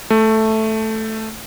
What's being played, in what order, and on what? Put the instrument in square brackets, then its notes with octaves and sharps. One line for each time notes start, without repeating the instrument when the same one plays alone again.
[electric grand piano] A3